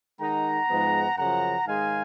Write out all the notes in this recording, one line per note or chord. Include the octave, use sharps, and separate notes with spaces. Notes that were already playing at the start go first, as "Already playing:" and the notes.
D#3 G#3 D#4 F#5 A#5
G#2 F3 G#3 B3
F#2 C#3 F3 F#5 A#5
G#2 D#3 G#3 D#4 F5 G#5